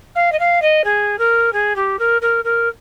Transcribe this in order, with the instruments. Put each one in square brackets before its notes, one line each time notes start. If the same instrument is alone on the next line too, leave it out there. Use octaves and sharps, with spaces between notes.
[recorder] F5
D#5
F5
D#5
G#4
A#4
G#4
G4
A#4
A#4
A#4